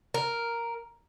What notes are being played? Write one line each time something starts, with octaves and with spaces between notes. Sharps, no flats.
A#4